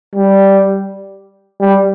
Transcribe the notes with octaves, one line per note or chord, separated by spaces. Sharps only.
G3
G3